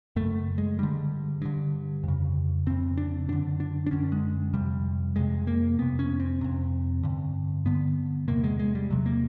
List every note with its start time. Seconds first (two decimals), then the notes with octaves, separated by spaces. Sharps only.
0.16 F#2 C#3 A3
0.58 G#3
0.79 G2 D3 G3
1.42 G2 D3
2.03 F2 C#3
2.66 F2 C#3 C4
2.97 D4
3.28 F#2 D3 D4
3.60 D4
3.86 D4
3.91 F#2 D3 C#4
4.12 G#3
4.53 F2 C3 G3
5.16 F2 C3 G#3
5.47 A#3
5.79 F2 C3 B3
5.99 C#4
6.20 C4
6.41 F2 C3
7.03 G2 D3
7.65 G2 D3 B3
8.28 E2 C3 A#3
8.44 G#3
8.59 G#3
8.75 G3
8.90 E2 C3 F#3
9.06 A#3